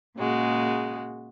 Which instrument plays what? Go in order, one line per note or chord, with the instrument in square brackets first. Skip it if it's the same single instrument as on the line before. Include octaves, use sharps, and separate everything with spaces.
[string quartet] A#2 C#3 G#3 F#4